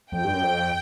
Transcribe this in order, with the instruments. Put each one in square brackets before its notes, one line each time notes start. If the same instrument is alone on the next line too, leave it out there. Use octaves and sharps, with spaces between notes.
[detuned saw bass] F2 [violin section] G5
[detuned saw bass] G2
F#2
F2